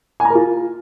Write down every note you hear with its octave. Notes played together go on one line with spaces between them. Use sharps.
G#5
A#5
A#4
F4